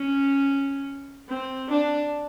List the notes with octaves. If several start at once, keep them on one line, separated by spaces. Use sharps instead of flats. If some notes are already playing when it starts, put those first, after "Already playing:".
Already playing: C#4
C4
D4